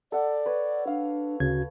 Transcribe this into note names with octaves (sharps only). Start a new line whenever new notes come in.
A4 D5 F#5
B4 C#5
D4 F5
D2 C#3 F#4 G#6